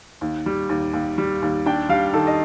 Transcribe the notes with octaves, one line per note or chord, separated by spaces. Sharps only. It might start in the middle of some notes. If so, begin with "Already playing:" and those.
D#2
G3
D#2
D#2
G3
D#2
D4 G5
G3 F5
D#3 A4
D#5